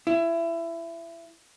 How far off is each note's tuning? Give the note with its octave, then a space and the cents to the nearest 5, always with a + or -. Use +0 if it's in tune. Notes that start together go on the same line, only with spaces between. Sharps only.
E4 +25